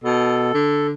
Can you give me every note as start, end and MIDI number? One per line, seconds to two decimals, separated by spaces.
0.04 0.53 47
0.04 0.87 69
0.54 0.94 50